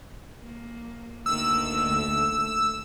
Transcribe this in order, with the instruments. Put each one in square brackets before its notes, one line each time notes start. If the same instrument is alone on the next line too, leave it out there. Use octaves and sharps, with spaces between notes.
[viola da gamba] A#3
[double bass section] D2 A3 [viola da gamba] D#3 A#3 [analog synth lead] E6